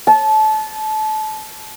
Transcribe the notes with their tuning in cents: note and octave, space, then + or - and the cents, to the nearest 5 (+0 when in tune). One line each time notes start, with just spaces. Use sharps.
A5 -25